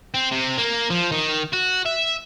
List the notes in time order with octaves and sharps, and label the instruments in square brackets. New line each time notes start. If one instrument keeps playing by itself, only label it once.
[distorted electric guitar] C4
C3
A#3
F3
D#3
F#4
E5